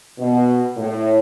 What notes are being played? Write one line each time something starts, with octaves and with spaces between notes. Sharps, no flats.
B2
A2